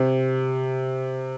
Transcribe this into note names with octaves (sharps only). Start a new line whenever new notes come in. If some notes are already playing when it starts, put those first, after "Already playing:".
Already playing: C3